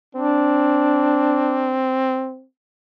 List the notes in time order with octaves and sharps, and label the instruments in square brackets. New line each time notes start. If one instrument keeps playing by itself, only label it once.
[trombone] C4 [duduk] D4